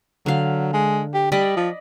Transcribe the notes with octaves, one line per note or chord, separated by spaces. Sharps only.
D3 F#3 F5
G#3
G4
G3 D5 D#5 B5
F3